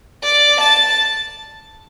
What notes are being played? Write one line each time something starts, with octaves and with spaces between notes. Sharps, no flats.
D5
A5